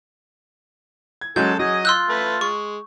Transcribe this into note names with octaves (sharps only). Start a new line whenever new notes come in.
G#6
F#3 G#3 C#4 A4 A5 G6
F#3 G#4 D#5 D#6
F4 C6 E6 F#6 G6
A3 B4
G#3 C#6